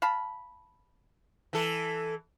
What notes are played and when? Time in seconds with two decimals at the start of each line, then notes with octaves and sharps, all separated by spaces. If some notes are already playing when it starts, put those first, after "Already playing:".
0.02 F5 A5 B5
1.53 E3 A4